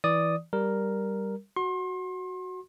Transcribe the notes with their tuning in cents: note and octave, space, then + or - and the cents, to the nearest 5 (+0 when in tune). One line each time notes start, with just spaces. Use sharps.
E3 -5 D5 +0 D#6 -5
G3 +0 A#4 +0
F#4 +0 C6 +35